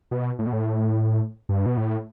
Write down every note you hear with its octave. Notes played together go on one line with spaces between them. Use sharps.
B2
A2
B2
A2
G2
B2
A2